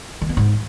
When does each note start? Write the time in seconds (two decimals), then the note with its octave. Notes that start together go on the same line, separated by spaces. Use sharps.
0.22 D#3
0.29 B3
0.37 G#2